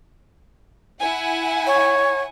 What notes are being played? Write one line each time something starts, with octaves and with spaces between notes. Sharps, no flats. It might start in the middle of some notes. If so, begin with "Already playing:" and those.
E4 F#5 G#5
C#5